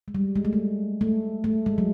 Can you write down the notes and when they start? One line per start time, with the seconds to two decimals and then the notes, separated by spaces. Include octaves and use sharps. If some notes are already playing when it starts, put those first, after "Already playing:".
0.08 G#3
0.15 G3
0.36 G#3
0.45 A3
0.53 G#3
1.01 A3
1.44 A3
1.66 G#3
1.78 F#3